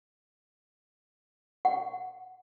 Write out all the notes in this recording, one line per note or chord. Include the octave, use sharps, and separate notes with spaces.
F#5